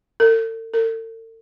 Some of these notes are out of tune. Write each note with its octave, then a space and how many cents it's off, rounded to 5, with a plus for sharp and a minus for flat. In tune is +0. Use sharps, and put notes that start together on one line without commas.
A4 +45
A4 +45